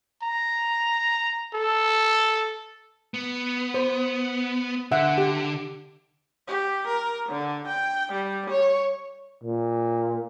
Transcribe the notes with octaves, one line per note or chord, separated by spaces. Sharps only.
A#5
A4
B3
C5
D3 E5 F#5
G4
G4
A#4
D3
G5
G3
C#5
A#2